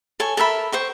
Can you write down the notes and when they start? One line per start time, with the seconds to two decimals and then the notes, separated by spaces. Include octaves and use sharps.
0.20 A4 C#5 G#5
0.37 A4 A#4 E5 B5
0.72 C5 G5 C#6